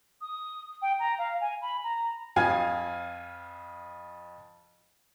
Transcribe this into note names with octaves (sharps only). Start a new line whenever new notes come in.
D#6
G5
A#5
F5
G#5
B5
A#5
F2 F3 F5 G#5 F6 G#6